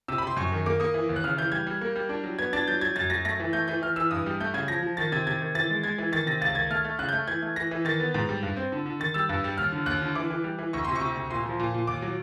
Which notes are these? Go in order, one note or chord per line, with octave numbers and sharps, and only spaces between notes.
C3 E6
B5
C3 C6
F#2 C#6
D#3
A#3 D6
A#3 D#6
E3
D#2
F#6
C#3 F6
E3 G6
G3 G#6
G3
A#3
G3
D4
F#3
B3 G#6
D4 A6
F#3 G6
F#3 G#6
F#2 A6
F#2 A#6
A3 A#6
E3
A3 G6
E3 G6
E3 F6
E3 E6
G2 D#6
G3
A3 G6
C#3 G#6
F3 A#6
F3
D#3 A6
C3 G#6
C3 G#6
D#3
E3 A6
G#3
G#3 G#6
E3
D#3 A6
C3 A#6
C#2 A6
D#3 G#6
A3 F6
A3
C#3 F#6
G6
A3
E3 G#6
A3
E3 A#6
E3
D#3 A6
B3
G#2
G3
G2
C4
D3
D3
D#3 A6
G3 E6
G2
G3
D#2 F6
D3
D#2 F#6
D3
E3 D6
E3
G3
E3
D2 C#6
C3 C6
C#6
C3
D2
A#2 C6
F3
A#2
A#2
D#2 D6
F#3